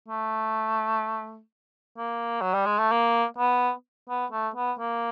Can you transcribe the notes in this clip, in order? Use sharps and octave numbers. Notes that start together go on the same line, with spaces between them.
A3
A#3
F#3
G3
G#3
A3
A#3
B3
B3
A3
B3
A#3